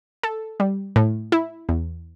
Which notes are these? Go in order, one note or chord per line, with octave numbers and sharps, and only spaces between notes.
A4
G3
A2
E4
E2